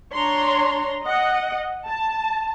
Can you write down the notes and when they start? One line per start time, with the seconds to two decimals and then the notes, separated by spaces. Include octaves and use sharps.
0.15 D4 C#5 A#5 C6
1.03 D#5 F#5
1.88 A5